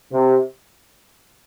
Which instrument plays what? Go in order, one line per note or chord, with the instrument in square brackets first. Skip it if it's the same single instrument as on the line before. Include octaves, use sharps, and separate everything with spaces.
[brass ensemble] C3